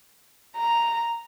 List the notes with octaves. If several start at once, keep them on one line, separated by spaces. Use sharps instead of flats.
A#5